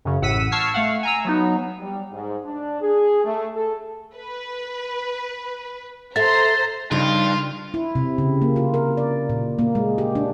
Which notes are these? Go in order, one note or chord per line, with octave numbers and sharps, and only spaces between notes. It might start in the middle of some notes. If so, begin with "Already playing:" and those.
F#2 C#3
A1 A2 F#5 E6 B6 D#7
A5 C#6 E6 F6 G#6 C7
A3 F5 F#5
G#5 A#5 E6
F#3 B3 D#4
G3
G#2
D4
G#4
A3
A4
B4
A4 C5 E5 A#5 C6 A6
G2 C#3 F3 D#4 F4
E4
C3
C#3
A#3
F4
A#4
D5
A#2
A#3
G#3
G4
D4